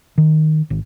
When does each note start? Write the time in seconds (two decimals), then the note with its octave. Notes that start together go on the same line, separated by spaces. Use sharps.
0.18 D#3
0.70 G#1